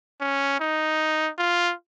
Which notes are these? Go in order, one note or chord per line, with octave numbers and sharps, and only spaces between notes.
C#4
D#4
F4